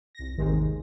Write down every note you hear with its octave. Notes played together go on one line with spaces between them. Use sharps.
C2 A#6
G#1 D#2 C3 D#3 G#3